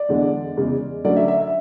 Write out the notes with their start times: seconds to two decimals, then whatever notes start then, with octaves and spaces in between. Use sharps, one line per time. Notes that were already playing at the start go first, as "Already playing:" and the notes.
Already playing: D5
0.09 E2 D3 G#3
0.57 E2 C#3 G#3
1.04 D3 F#3 A3 C#4 D5
1.17 E5
1.28 E5
1.40 E5